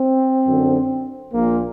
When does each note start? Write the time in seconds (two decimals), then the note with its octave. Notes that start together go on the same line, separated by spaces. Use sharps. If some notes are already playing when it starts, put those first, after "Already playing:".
Already playing: C4
0.45 F#2 D3
1.33 A#1 A#2 A#3